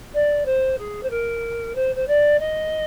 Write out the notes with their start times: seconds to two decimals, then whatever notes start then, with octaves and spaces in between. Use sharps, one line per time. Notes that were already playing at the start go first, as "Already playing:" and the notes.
0.14 D5
0.45 C5
0.78 G#4
1.02 C5
1.10 A#4
1.75 C5
1.95 C5
2.07 D5
2.39 D#5